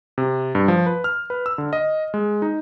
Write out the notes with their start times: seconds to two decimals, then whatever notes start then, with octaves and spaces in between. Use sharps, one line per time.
0.18 C3
0.55 G2
0.68 F3
0.86 B4
1.04 F6
1.30 B4
1.46 E6
1.58 D3
1.73 D#5
2.14 G#3
2.42 D#4